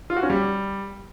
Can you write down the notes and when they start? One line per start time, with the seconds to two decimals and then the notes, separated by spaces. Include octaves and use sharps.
0.10 F4
0.16 F#4
0.23 C#4
0.30 G3